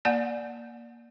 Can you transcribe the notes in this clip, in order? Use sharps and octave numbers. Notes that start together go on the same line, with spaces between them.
A#3 D5 F#5 G#5 A5